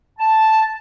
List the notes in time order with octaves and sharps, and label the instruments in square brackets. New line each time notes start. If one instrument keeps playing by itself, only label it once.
[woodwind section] A5